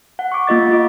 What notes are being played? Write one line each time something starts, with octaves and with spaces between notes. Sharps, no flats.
F#5
C#6 D6
A#3 F4 D#5 A6
F4 D6